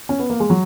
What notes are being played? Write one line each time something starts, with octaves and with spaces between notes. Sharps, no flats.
C#4
B3
A#3
G#3
F#3